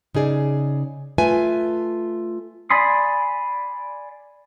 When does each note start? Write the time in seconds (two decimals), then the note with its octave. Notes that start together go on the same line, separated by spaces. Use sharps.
0.15 C#3 D#4 G#4 D5
1.18 A3 F4 B4 E5 G#5
2.70 D5 G#5 B5 C6 D#6